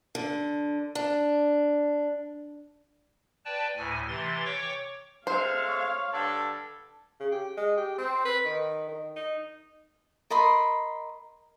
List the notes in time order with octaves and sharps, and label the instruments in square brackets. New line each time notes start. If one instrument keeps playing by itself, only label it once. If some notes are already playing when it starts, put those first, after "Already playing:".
[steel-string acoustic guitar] D3
D4
[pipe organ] B4 D5 G5 A5
D2 A2 G#5
C3 E3 C6 A6
C#5 G5 C#6 D6
[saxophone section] G#3 A3 C4 [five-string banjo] C5 [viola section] F5
[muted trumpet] C#5
[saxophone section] G2 D3 [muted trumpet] A4
[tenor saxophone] C#3
G4
G#3
G4
C4
B4
D#3
D#3
D#4
[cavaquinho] A#4 D#5 B5 C6